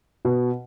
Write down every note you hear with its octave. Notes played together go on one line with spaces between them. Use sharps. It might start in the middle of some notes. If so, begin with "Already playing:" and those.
B2